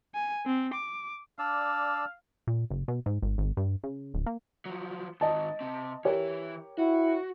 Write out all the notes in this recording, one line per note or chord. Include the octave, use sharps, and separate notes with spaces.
G#5
C4
D6
D4 D5 F5 E6
A#2
F#1
B2
G#2
G#1
G#1
G2
C#3
D1
A#3
F3 F#3
G#2 D#3 D#5 A5
C3 C4
E3 E4 G4 A#4 C#5
E4 F#4